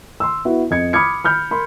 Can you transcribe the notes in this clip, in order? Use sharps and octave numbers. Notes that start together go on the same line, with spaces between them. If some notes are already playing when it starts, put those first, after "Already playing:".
C6 E6
B3 E4 F#4
F2 D#5 G#6 C#7
B5 D6 D#6 F6 G#6 C#7
B5 F6 G6
A#4 B5 C6